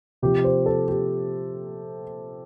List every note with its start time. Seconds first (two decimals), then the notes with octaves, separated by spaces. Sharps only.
0.22 C3 F3 G4
0.44 C5
0.66 A4
0.88 G4